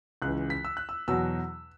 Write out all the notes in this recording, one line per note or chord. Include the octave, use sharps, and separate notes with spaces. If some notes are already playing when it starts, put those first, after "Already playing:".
C#2 C#3 E3 F#6
B6
E6
F#6
E6
E2 B2 F#3 E6